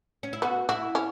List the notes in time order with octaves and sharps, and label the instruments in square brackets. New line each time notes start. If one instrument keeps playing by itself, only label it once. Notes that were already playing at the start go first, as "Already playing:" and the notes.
[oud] C#4
E4
[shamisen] B3 [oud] F#4
[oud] E4 [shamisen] F#4
[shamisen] C#4